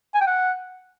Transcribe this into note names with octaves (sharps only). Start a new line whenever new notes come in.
G#5
G5
F#5